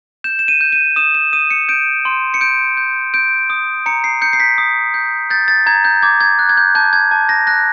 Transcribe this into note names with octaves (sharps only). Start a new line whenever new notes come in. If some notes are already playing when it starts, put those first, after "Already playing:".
G6 E7
E7
D#7
G6
D#7
D#6 E7
E7
D#6 D#7
C#7
G6 D7
C6
C#7
G6 D7
G6
G6 D7
D#6
A#5 C#7
C7
G6 C#7
C7
B6
D#6
G6
G6 A6
A6
A#5 G#6
G6
D6 G#6
G#6
F#6
G#6
G6
A5 G6
G#6
A5
A#6
F#6 A#6